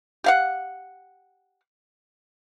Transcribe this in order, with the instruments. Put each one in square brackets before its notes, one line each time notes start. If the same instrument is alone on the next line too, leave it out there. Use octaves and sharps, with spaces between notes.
[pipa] G4 F5 F#5